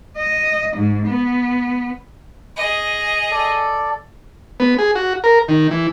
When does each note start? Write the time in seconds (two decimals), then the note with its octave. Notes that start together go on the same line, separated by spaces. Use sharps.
0.17 D#5
0.76 G#2
1.07 B3
2.57 G#4 D#5
3.31 A4 D5
4.60 B3
4.79 G#4
4.95 F#4
5.24 A#4
5.48 D#3
5.71 E3